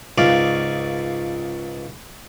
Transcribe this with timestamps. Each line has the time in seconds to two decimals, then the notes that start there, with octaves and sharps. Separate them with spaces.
0.18 C#2 G#2 D5 F5